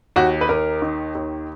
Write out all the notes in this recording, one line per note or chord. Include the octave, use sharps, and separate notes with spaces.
D#2 F#4
B4
D#2 A#4
D#3
D#2